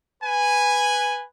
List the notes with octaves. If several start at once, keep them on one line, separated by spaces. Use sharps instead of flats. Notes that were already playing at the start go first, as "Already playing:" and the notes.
B4 G#5